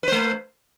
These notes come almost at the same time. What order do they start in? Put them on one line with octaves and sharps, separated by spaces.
B4 C5 A3